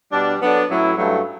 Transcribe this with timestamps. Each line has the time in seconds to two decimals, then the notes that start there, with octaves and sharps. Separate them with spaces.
0.12 B2 G3 D4
0.41 F#3 B3 D4 A4
0.69 A2 F#3 C#4 E4
0.97 G2 F#3 A3